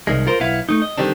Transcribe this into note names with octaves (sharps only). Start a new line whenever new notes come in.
C2 D#3 G#3
F4 A#4 C5
B1 B3 E4 F5
A3 D#4
D#5
D3 D#3 G3 C4 D4